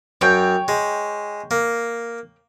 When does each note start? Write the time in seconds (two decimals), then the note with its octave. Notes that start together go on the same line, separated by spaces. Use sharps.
0.21 F#2 C#5 G5
0.68 G#3
1.51 A#3